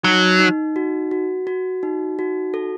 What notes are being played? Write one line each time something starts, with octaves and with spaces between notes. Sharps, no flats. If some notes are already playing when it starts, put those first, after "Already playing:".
F#3 D#4
D#4
F#4
F#4
F#4
D#4
F#4
A4